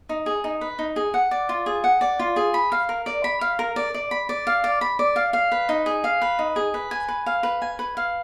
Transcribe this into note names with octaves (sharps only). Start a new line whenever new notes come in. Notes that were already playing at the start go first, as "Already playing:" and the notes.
D#4
G#4
D#4
B4
D#4
G#4
F#5
D5
F4
G#4
F#5
D5
F4
G#4
B5
F5
A#4
D5
B5
F5
A#4
D5
D5
B5
D5
F5
D5
B5
D5
F5
F5
B4
D#4
G#4
F5
B4
D#4
G#4
B4
G#5
B4
F5
B4
G#5
B4
F5